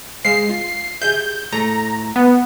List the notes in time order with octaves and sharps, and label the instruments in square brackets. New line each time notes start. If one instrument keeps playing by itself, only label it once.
[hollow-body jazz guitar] G#3 C5 F5 [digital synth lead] C7
[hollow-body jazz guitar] F4
[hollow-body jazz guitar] G4 G#4 E5 [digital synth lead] G6
[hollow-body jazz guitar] A2 A3 A4 [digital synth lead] A#5
[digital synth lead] B3